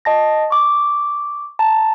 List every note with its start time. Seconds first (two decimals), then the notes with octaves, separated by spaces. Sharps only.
0.05 D#5 A5 A#6
0.50 C#6 D6
1.59 A5 A#5